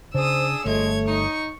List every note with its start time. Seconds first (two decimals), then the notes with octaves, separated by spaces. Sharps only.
0.14 C#3 D4 G#4 C5 D#6 E6
0.65 G1 F3 G#3 A3 C#5 G#6
1.08 D#4 C#6